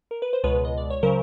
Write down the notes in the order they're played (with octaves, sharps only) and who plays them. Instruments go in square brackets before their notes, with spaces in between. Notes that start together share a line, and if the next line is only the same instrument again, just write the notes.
[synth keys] A#4
B4
C5
C#2 B2 G#3 B4 C#5
D#5
D5
C#5
C#3 F#3 A#4 C5